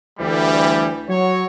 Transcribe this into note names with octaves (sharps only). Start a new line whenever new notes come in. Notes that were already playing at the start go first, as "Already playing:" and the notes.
D2 E3 G3
F#3 C#5